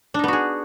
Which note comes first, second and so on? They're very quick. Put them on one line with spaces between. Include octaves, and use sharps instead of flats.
D4 D#4 B3 F#4 G#4